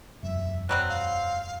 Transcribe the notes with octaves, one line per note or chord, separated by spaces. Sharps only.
E1 F#2 E5
F#3 G3 C4 F#6
F5